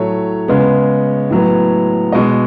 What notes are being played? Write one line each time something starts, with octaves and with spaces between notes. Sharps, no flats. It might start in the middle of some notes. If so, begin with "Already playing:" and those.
Already playing: A2 F#3 A3 C#5
C#3 G#3 B3
A2 F#3 B3
B2 G#3 B3 D#5